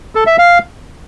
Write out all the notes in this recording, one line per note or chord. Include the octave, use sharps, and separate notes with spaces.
A4
E5
F5